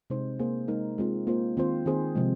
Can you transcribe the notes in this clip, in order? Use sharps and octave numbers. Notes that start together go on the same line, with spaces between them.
C3 G#3 D#4 C5
A#3 G#4 C5
G#3 D#4 A#4
G#3 C4 F4
A#3 F4 C5
D#3 C4 F4 C5
D#3 C4 G#4 C5
C3 F3 G#3